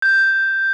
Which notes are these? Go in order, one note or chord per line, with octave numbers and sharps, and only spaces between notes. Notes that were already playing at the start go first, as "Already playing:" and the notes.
G6